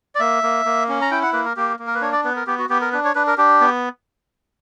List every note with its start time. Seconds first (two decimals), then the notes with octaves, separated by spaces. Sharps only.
0.15 D5
0.20 A#3 E5
0.43 A#3
0.65 A#3
0.89 C#4
1.02 A#5
1.11 E4 G5
1.23 F#5
1.33 A#3 B4
1.45 A#4
1.57 A#3 G4
1.79 A#3
1.87 A#4
1.95 B4
2.01 D4 C#5
2.13 D5
2.24 B3 B4
2.36 A#4
2.47 B3 G4
2.58 F#4
2.69 B3 G4
2.81 A#4
2.92 D4 B4
3.05 C#5
3.15 D4 B4
3.27 A#4
3.38 D4 G4
3.61 B3